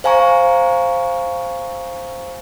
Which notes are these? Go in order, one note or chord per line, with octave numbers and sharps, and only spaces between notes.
C5 F5 G#5 A#5 C#6